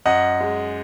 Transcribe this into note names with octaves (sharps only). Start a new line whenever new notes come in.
F#2 D#5 F#5
G#3